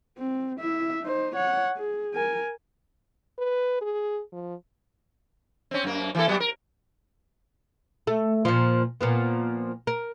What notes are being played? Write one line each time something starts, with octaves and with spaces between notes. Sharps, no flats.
C4
E4 E5
D#4 C5
C#5 F#5
G#4
A#4 G#5
B4
G#4
F3
C4 C#4
F#2 A#3
E3 A#3 A4
F#3 G3 B3
A#4
A3
A#2 F3
A#2 F3 B3
A#4